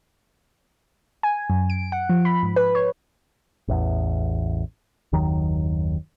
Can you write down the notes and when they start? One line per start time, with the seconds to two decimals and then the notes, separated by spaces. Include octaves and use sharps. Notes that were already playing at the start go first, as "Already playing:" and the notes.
1.23 G#5
1.50 F#2
1.70 D7
1.92 F#5
2.09 F3
2.25 B5
2.43 G#2
2.56 B4
2.75 C#5
3.68 A1 E2
5.12 F#1 D#2 D#3 F#3